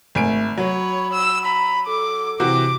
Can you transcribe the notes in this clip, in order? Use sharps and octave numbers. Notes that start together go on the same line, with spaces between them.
G#1 A3 G#5 D7
F#3 C#5 B5
E6
A#5 B5
A4 D6
C3 E3 F#4 D6